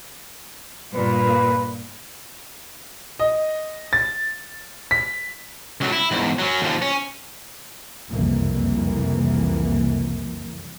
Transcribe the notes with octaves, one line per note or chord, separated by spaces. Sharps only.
G2 A#2 B4
D#5
A6
B6
C#2 F#3
E4
E2 G#2
F#3 C#4
D#2 F3
C#4
F#1 C2 F2 E3 A#3